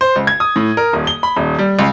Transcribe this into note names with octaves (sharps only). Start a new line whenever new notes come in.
C5
C#2
G#6
D#6
A2
A#4
D#1
G7
B5
D#1
G3
C#2